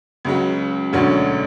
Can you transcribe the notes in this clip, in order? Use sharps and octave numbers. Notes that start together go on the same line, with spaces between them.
C#2 C#3 F#3
E1 D2 D3 F#3 C#4